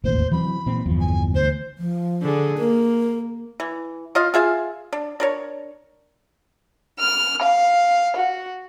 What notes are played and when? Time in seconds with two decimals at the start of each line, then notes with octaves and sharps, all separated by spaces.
0.04 E1 A1 D#2 C5
0.32 E3 F#3 C4 B5
0.66 A#2 E3 C4
0.86 G1 E2 F3
0.99 G#5
1.34 D2 C5
1.78 F3
2.22 D3 G#4
2.58 A#3 A#4
3.60 E3
4.15 F4 D#5 F5
4.34 F4 G#4 E5 F5
4.93 D4
5.20 D4 A#4 C#5
6.99 F6
7.42 F5
8.16 F#4